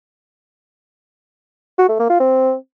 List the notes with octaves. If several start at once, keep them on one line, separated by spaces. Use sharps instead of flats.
F#4
A3
A#3
F4
C4